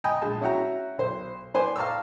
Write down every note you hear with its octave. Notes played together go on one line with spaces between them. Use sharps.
D#5 G5 G#5 A#5 B5
A#1 G#3 A5
C#4 E4 F#4 F#5 G5 A#5
B1 C5
B4 C5 D5 G#5
F5 A5 A#5 C#6 D6 E6